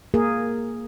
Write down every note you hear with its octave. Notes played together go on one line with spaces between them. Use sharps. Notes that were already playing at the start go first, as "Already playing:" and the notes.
A#3 G#4 A#4